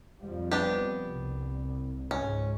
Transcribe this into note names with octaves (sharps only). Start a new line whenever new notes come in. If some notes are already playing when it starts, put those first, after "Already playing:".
F2 F3 G3
B3 D4 G4
C2
C#2 G#2 C#4